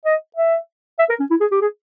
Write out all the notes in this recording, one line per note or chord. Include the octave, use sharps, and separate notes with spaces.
D#5
E5
E5
A#4
C#4
E4
G#4
G4
G#4